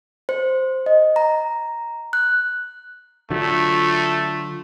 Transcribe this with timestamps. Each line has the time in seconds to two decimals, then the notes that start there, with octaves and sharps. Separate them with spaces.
0.29 C5
0.86 D#5
1.16 A#5
2.13 F#6
3.30 D3 F#3 A3 F4